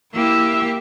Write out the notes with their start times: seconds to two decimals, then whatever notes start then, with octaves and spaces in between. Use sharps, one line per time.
0.13 A#3 E4 G4 E5